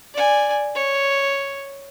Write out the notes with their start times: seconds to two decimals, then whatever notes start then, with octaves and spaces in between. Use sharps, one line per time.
0.14 D5 G#5
0.75 C#5